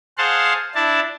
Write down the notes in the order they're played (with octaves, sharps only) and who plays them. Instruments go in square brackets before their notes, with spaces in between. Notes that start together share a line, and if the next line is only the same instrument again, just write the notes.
[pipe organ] G#4 C5 F5 F#5 A5 C6
D4 E4 A5